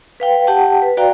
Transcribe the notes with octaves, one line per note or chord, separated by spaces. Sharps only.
B4 F5 G5
G4 F#5 G5 A5
B4
F#4 D5 F5 G5 A#5